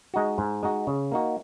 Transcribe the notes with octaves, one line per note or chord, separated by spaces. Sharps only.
G#3 D#4 F#4
G#2
G#3 D#4 F#4
C#3
A#3 D#4 F#4